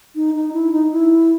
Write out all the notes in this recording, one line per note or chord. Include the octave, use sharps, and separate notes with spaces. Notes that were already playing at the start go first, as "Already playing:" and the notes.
D#4
D#4
E4
D#4
E4